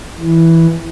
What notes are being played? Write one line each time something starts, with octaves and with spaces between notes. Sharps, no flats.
E3